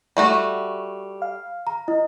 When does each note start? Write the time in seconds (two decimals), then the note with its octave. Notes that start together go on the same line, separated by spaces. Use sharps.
0.17 G3 A3 F#4
1.22 F5
1.67 A#5
1.88 E4 D#5